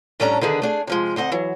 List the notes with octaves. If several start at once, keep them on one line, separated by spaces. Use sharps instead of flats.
A2 G3 C#4 D4 A4 A#5
D3 D#3 B3 D4 G#4
A3 D4 G#4
C3 F3 G#3
D2 C4 D#5 F#5
E3 F#3